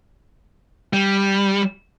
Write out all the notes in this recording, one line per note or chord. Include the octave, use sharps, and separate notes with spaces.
G3